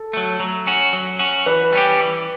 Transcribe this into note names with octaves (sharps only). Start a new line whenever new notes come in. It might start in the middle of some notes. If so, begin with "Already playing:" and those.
Already playing: A4
F#3 A3
F#3
C#4 F#4
F#3
C#4 F#4
E3 B4
G3 C#4 G4
E3